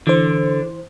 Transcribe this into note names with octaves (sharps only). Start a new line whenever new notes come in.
D3 E3 C5